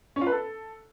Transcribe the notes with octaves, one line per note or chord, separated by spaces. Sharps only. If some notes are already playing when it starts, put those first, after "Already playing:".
C#4
F4
B4
A4